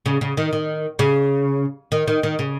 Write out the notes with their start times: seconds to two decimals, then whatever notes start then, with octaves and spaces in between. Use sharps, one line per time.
0.06 C#3
0.21 C#3
0.37 D#3
0.53 D#3
0.99 C#3
1.92 D#3
2.08 D#3
2.23 D#3
2.39 C#3